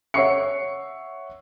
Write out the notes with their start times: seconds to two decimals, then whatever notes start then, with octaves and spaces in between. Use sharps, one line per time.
0.14 C#5 E5 F#5 C#6 C7 C#7